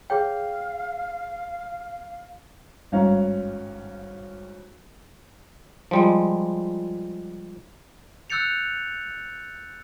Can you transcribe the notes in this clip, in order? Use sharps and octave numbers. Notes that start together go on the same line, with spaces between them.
G#4 C#5 F5 G5
G#1 G2 C#4 F5 A#5
F3 G3 G#3
E6 F#6 G6 A6 C#7 F7